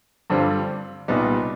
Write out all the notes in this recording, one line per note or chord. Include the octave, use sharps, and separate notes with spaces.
G2 D3 G3 C4 F4
C2 A#2 G3 B3 D#4